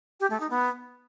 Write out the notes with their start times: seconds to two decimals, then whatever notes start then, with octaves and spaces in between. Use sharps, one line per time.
0.20 G4
0.30 A3
0.40 D#4
0.50 B3